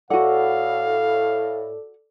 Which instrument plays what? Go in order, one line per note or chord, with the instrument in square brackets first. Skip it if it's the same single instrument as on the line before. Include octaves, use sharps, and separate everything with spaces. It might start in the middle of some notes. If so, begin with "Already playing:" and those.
[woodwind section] A2 [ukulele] F#4 F#5 [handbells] A4 D5 D6 [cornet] F5